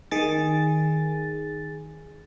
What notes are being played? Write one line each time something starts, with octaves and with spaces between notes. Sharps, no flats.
D#3 G#4 A6